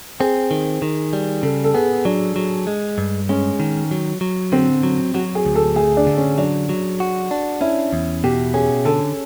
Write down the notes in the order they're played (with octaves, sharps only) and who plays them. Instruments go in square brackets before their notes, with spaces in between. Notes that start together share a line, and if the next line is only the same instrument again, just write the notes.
[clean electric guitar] C4 [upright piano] G#4
[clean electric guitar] D#3
D#3
G3
[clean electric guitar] C#3 [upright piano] A4
[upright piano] A4
[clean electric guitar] B3 [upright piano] G#4
[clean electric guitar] F#3 [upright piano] D4
[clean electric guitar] F#3
G#3
G2
[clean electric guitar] G#3 [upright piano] C#4
[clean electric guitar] D#3
F#3
F#3
[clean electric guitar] D3 [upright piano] C4
[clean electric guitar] F#3
[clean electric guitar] F#3 [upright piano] F#4
[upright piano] G#4
[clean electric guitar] D2
[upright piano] A4
[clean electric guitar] A3 [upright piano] G#4
[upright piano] D4
[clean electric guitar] D3
[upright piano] C#4
[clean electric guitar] F#3 [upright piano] D4
[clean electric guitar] F#3
F#4
D4
[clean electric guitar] C#4 [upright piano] E4
[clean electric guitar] E2
[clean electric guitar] B2 [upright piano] G4
[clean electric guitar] C#4 [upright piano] G#4
[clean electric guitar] D3 [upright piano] A4